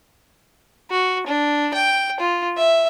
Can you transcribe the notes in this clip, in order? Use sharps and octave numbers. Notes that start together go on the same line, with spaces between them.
F#4
D4
G5
F4
E5